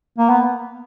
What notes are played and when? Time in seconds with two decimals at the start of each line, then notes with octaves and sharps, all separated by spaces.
0.18 A#3
0.30 B3